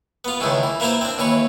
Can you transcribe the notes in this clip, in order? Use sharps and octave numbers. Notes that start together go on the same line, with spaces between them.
B3 F4
C#2 A2 D#3 E3 A3
E3
A#3 E4 F4 C5 E5
C4 D4
D#2 E3 B4 C#5